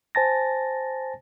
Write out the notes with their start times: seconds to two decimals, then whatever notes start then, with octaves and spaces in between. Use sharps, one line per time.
0.15 C5 G#5 A5 A6 A#6